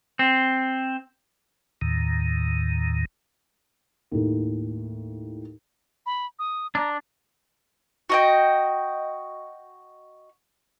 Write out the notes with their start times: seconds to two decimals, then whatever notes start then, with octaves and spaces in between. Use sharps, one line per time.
0.19 C4
1.81 D#2 A2 D#3
4.11 D#2 A2
6.06 B5
6.39 D#6
6.75 D4 A#5
8.10 F#4 D#5 G5